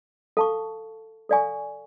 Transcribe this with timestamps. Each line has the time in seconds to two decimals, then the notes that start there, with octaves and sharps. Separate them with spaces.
0.37 A4 F5 A5 C#6
1.29 A4 D5 F5 G#5 C#6